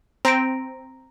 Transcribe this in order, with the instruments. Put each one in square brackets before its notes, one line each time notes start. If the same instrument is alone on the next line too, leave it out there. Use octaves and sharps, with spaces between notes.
[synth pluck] C4 [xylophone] A#5 A#6 D7